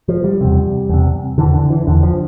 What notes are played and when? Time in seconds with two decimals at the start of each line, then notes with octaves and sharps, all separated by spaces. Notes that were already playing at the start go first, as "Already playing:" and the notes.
0.08 F3
0.24 G3
0.41 E2 C3
0.89 E2 C3
1.38 E2 D3 E3
1.54 D3
1.70 E3
1.87 E2 D3
2.03 F3